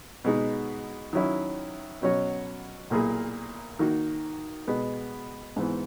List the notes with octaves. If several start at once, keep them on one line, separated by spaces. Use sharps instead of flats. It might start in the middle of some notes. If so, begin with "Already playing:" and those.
B2 G#3 B3 D#4
D#3 F#3 C#4 E4
B2 F#3 C#4 F#4 C#5
B1 A#2 A#3 E4 G#4
D#3 A#3 D#4 F#4
B2 G#3 B3
G#2 E3 B3